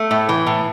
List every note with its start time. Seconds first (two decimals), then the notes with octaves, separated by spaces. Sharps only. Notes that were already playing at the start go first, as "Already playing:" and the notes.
Already playing: A3
0.11 A2
0.29 E3
0.46 A2